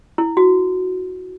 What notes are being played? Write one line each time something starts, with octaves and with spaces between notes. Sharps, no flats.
E4
F#4